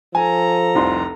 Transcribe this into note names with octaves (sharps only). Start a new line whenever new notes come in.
F3 A4 G#5 A#5
F1 C2 C6